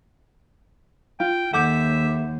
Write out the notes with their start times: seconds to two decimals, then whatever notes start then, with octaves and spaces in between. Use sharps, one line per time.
1.20 F4 G5
1.53 D#2 A4 E5 F#5 D6 G6